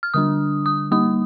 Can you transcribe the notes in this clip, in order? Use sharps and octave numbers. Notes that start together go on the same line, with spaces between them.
F6
D3 G3 D4 D#6
D#6
G3 A#3 D#4 D#6